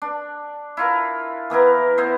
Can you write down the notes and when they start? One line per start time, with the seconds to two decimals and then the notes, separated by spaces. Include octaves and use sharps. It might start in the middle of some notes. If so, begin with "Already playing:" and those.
0.02 D4
0.77 E4 F4 A#4
1.50 E3 B3 E4 A#4
1.98 B3 E4 C5